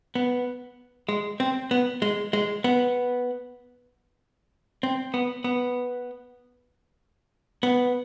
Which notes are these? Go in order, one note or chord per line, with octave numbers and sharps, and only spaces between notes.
B3
G#3
C4
B3
G#3
G#3
B3
C4
B3
B3
B3